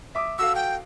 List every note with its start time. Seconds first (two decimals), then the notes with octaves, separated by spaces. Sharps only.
0.15 E5 D6 D#6
0.38 F#4 A4 F5 E6
0.55 G5